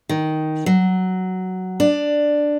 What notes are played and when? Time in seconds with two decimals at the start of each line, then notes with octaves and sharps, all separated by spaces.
0.09 D#3
0.66 F#3
1.80 D4